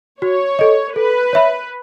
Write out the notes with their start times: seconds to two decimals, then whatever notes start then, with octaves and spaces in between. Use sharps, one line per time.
0.21 F#4 C#5
0.59 A4 D#5
0.95 A4 B4
1.33 C#5 E5 B5